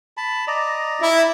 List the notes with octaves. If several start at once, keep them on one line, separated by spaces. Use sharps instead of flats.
A5 B5
D5 D#5 A#5
E4